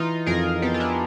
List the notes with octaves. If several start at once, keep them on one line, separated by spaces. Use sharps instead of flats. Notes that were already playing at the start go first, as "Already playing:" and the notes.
Already playing: E3 D#4 F4
F2 G#4 A#4
B3 G4 A4
F4
D4 E4